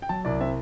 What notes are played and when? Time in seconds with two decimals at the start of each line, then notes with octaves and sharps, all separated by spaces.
0.02 G5
0.09 F#3 A5
0.25 C2 D5
0.41 C4 E5